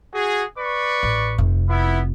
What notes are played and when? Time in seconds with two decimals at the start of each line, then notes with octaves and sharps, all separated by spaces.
0.13 F#4 G#4
0.58 B4 D5 C#6
1.03 A1
1.38 F1 C3
1.68 B3 E4